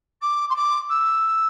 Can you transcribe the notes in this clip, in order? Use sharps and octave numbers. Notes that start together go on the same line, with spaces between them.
D6
C6
D6
E6